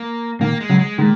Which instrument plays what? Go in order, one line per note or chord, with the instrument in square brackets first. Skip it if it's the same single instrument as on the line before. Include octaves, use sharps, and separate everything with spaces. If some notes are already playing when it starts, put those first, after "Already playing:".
Already playing: [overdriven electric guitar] A#3
[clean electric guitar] A#2 D#3 [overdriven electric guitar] A#3
[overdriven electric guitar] G#3
[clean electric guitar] C#3 F#3
[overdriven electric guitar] G#3
[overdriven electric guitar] A#2 [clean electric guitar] D#3 G#3